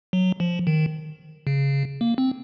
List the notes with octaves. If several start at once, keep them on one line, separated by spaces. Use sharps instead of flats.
F#3
F3
D#3
C#3
A#3
C4